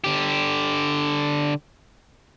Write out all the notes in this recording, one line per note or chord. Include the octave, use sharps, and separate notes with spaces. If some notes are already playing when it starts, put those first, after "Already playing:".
D3 G4